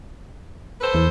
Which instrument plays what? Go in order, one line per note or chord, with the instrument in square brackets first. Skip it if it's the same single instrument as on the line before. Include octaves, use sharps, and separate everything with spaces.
[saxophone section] A4 B4 C5
[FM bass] E2